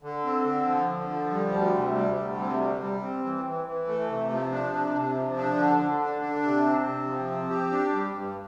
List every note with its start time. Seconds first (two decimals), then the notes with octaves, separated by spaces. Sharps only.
0.03 D3
0.25 C4
0.46 D3
0.68 F3
0.89 D3
1.09 F3
1.31 G3
1.52 D2
1.74 C3
1.95 G3
2.17 D2
2.38 C3
2.60 G3
2.81 G3
3.03 C4
3.23 E3
3.45 E3
3.66 E3
3.87 A3
4.09 C3
4.30 F3
4.51 D4
4.73 C3
4.95 C3
5.16 F3
5.36 D4
5.58 D3
5.80 D3
6.01 D4
6.22 D4
6.43 C3
6.65 C4
6.87 C3
7.07 F3
7.29 C4
7.50 G4
7.72 D4
7.93 G3
8.15 G2